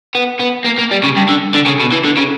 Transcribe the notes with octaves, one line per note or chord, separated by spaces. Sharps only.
B3
B3
A#3
A#3
G3
C#3
G2
D3
D3
C#3
B2
E3
D3
C#3